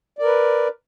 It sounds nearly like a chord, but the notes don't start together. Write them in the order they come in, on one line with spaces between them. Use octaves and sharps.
D5 A#4 B4